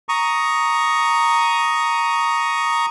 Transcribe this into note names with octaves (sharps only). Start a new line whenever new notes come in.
A#5 C#6 D#6